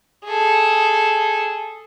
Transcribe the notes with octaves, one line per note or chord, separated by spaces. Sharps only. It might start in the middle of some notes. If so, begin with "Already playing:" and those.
G#4 A4